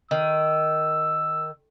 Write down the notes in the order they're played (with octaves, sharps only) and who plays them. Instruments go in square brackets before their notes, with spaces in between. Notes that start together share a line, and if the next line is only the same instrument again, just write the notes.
[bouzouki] D#3 [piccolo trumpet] E6